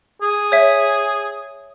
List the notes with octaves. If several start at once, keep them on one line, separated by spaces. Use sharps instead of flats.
G#4
C#5 E5